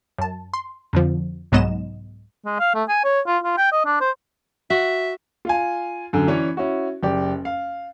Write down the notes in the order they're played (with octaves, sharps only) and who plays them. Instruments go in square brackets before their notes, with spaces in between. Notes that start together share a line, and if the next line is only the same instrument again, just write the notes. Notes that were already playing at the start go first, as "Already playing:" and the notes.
[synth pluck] F#2 A5
C6
F2 D3 F3
C2 G#2 F#3 B3 D#5 E7
[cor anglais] G#3
F5
A3
G#5
C#5
F4
F4
G5
D#5
D4
C5
[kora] F#4 [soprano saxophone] E5
[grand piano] F4 F5 G#5
F#2 D3
E3 C#4 C#5 D5
C#4 E4 F#4
F#1 G4 D5
F5